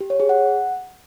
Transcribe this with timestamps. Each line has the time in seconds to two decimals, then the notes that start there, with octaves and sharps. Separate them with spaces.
0.01 G4
0.10 C#5
0.20 G#4
0.29 F#5